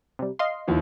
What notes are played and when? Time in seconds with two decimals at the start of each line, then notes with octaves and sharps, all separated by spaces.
0.19 C3 G3
0.39 D#5 F5 C6
0.68 D#2 E3 F3